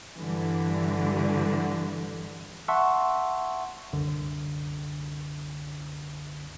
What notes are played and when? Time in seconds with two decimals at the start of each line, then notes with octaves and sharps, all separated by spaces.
0.18 G2 D3 E3
2.68 E5 F#5 A5 C6 C#6 E6
3.93 C2 F#2 D3